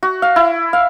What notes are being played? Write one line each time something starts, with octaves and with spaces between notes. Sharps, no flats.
F#4
F5
E4
F5